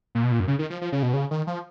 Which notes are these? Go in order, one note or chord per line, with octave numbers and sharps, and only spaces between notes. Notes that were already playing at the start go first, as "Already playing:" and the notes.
A#2
B2
A#2
F#2
C#3
D#3
F3
F3
C#3
B2
C#3
D#3
F3